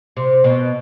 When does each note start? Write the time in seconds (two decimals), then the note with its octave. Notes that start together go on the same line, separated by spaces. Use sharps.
0.17 C3
0.44 B2